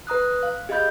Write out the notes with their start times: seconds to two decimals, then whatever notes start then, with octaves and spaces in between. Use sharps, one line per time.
0.07 B4 A#5 D#6 F#6
0.19 F#6
0.43 F5
0.69 G4 G#4 D#5 F5 B5 G6